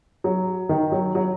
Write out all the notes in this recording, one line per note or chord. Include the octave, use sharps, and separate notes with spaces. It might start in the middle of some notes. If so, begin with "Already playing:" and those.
F#3
D#3
F#3
F#3